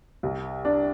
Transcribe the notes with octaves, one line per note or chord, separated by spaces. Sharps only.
C2
D4